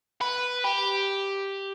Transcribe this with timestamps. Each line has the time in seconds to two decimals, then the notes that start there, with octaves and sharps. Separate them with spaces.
0.21 B4
0.65 G4